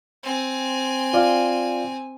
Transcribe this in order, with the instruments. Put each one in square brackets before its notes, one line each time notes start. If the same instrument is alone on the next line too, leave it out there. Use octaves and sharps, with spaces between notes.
[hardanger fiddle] C4 G#5
[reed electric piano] F4 D5 F5